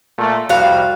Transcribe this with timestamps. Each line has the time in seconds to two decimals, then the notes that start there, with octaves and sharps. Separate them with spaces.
0.18 A#2 A3
0.49 C2 F2 G3 F#4 F5